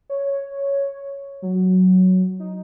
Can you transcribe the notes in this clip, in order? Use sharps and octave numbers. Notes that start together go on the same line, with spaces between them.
C#5
F#3
D#4